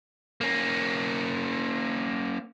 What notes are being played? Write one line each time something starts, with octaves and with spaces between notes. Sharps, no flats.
A#3 C#4